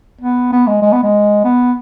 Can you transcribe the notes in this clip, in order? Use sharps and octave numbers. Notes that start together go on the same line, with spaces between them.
B3
B3
G#3
G#3
B3
G#3
B3